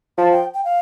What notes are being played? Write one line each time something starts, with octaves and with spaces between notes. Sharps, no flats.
F3 A5
G5
G5
F5